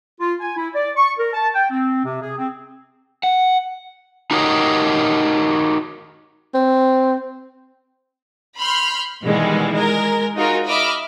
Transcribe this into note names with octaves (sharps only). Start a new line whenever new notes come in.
F4
G#5
E4
D5
C#6
A#4
A5
G5
C4
C3
G#4
C4
F#5
D#4 F#4 G4 A#4 C#5 D#5
C4
B5 C6 F6 G6
B2 D#3 E3 G3 G#3
G#3 A#4
D#4 F4 F#4 G#4 A#4
D#5 E5 B5 D6 F6